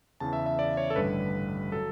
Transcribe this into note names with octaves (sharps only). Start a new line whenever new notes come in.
E2 C#3 E3 A5
E5
E5
D5
C#5
A4
A1 G2 D3 G3 B4
F#3 A4